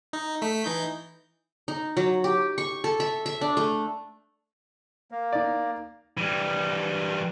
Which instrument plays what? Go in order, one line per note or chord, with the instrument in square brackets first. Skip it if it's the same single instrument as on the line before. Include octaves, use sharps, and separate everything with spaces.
[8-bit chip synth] D#4
A3 B6
E3 D#4 G6
[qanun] D#4
F#3
G4
C#6
A4
E5
E5
D4
A3
[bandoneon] A#3
[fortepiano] D#4 D5
[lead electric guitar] E3 G3